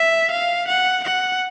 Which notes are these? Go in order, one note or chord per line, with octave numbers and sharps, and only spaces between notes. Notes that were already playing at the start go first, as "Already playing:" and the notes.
Already playing: E5
F5
F#5
F#5